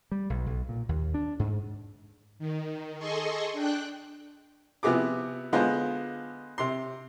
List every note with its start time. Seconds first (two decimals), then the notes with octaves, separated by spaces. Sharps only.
0.12 G3
0.30 B1
0.47 B1
0.69 A#2
0.89 D#2
1.14 D4
1.39 G#2
2.39 D#3
2.99 G#4 A4 D#5 C6 C#6
3.53 D4 G5 F#6
4.83 C3 F3 B3 G#4 D6
5.53 D3 G#3 B3 F4 C5
6.58 C3 C6